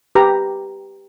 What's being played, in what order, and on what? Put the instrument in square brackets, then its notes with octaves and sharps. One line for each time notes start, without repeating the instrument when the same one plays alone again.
[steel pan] G4 B4 A#5